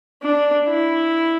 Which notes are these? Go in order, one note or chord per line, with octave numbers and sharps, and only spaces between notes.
D4
E4